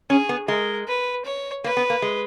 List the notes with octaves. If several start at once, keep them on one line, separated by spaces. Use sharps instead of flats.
C#4 G#4
B3
G#3 A#4
B4
C#5
A#3 B4
B3
A#3
G#3